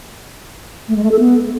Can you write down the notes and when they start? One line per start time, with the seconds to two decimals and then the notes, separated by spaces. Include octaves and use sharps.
0.88 A3
0.96 G#3
1.03 A3
1.11 A4
1.19 B3